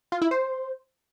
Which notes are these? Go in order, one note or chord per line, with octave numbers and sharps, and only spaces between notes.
F4
E4
C5